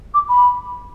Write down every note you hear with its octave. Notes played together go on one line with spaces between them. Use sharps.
D6
B5